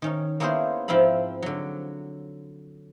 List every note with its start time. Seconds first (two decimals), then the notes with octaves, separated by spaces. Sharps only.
0.02 D#3 C#4 D#4
0.40 A#3 B3 C#4 E4 G#4 C5
0.88 G#2 F3 C4 E4 F5 B5
1.42 D3 F#3